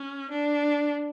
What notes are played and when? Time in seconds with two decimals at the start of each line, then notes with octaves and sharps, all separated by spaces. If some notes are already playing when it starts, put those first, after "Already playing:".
Already playing: C#4
0.30 D4